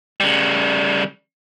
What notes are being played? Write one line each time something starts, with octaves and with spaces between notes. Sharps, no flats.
C#3 G3